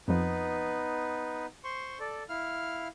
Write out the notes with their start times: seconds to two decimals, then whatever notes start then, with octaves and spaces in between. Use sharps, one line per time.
0.08 F2 F3 B3 D#4 B4
1.64 C5 C6 C#6
2.00 A4 D5
2.29 E4 F5 F6